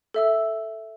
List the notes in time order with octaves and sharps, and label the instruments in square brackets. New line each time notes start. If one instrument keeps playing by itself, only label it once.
[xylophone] A4 E5 E6